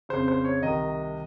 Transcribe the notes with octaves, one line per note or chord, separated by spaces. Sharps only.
F2 C#3 C5
C5
C#5
C2 C3 D#3 D#5